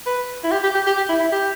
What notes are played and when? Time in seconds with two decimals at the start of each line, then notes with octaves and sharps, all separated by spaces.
0.07 B4
0.44 E4
0.52 G4
0.63 G4
0.75 G4
0.87 G4
0.97 G4
1.09 E4
1.20 E4
1.32 G4